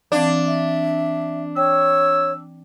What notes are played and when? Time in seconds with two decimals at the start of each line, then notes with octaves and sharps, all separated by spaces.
0.12 E3 C4 D4 F5
0.47 E5
1.56 C#5 G5 E6